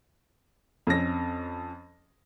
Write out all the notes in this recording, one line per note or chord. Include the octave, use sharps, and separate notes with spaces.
F2 C#4 A#6